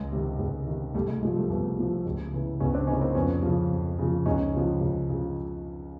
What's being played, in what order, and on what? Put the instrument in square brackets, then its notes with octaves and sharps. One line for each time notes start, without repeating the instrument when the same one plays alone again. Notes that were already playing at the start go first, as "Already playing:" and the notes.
Already playing: [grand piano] C#2 G#3
C3 D#3
C#2
C3 D#3
C2 G3 A3
G#3
A#2 F3 G#3
G3 A3
C2 A3 B3
A#2 F3
C#2
C#3 E3
C#2 B3 C#4
C4 D4
C#3 E3 C#4 D#4
A#3 C4
F2 B3 C#4
C#3 F3
F2
C#3 F3
C#2 C#4 D#4
C#3 F3
C#2
C#3 F3